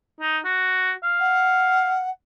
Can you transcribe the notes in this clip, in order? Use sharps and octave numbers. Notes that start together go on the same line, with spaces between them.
D#4
F#4
F5
F#5